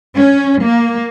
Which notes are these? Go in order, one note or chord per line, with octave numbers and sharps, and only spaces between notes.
C#4
A#3